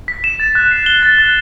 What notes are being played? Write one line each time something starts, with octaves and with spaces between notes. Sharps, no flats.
B6
E7
A6
F#6
C7
G7
A6
F#6